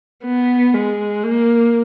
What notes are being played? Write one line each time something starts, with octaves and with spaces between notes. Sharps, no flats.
B3
G#3
A#3